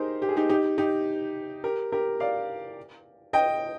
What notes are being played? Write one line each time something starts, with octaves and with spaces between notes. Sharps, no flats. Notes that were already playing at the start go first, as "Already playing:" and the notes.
Already playing: D#4 G4 G#4 A#4 C5
G4
G#4
D#4 G4
D#4 G4
D#4 G4
G4 A#4
G4 A#4
D5 F5
D#5 G5